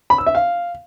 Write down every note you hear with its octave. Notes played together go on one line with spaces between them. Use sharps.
B5
E6
E5
F5